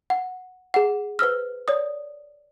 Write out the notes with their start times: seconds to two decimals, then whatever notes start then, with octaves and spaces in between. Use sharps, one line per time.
0.10 F#5
0.74 G#4 F#5
1.19 B4 C5 E6 F6
1.68 C#5 D5 D#6